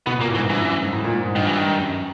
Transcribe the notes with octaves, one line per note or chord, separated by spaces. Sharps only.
B2 B3
A#2 A#3
A2
E3
G#2
G2 E3
F#2
F#2
G#2
A2
A#2
G#2
G#2
G2 D#3
E3
D#3
F#2